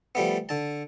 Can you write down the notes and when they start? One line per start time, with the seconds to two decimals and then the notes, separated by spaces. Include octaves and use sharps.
0.15 F3 G3 A3 B3
0.49 D3 A5